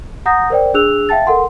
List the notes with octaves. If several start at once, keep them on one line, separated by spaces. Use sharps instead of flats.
F#5 A#5 D#6 G6 A#6
A#4 C5 D5 G5
D4 G#4 E6 F#6 F7
E5 F5 G5 A5 A6
A4 A#4 F#5 C6